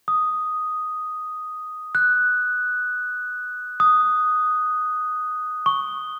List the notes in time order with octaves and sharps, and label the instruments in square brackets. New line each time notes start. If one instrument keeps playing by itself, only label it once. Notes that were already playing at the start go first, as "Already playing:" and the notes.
[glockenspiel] D#6
F#6
D#6
C#6